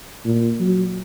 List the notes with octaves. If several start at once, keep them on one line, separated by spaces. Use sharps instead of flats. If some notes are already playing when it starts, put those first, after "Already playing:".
A#2
F#3